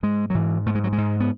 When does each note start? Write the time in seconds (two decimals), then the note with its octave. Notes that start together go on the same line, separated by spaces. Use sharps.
0.03 G#2 G#3
0.30 F#3
0.35 G#2 E3
0.66 G#2 A3
0.75 G#3
0.84 F#3
0.93 G#3
0.98 G#2
1.20 B3